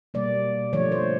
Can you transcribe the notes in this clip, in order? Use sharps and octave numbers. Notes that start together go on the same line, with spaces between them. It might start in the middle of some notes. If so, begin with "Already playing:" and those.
B2 G3 A#3 D5
D3 F3 A3 C#5
C5